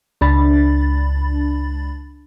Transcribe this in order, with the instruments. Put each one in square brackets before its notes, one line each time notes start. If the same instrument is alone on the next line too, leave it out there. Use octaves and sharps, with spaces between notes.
[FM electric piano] C#2 D4 B5 A6